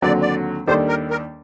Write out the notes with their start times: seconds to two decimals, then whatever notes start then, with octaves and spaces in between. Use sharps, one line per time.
0.02 D#2 D3 F#3 C4 D5
0.21 D5
0.67 D#2 D#3 G3 D4 A4 C5
0.89 A#4
1.10 A#4